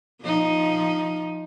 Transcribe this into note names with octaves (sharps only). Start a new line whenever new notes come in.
F3 D#4